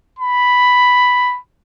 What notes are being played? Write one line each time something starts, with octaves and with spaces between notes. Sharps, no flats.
B5